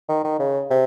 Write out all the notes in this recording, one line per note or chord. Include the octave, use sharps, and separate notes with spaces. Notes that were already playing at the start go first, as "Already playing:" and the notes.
D#3
D#3
C#3
C3